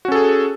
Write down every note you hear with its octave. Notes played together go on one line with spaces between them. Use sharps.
C#4 F#4 G#4 A4